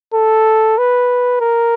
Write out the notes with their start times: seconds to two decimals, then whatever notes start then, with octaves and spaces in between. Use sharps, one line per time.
0.14 A4
0.78 B4
1.41 A#4